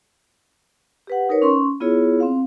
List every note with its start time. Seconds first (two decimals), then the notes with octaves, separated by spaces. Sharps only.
1.07 G4 B4 F#5
1.29 D#4 A#4 B4 C#5
1.42 C#4 C6 C#6
1.80 B3 E4 F4 G#4 C#5
2.20 C4 F5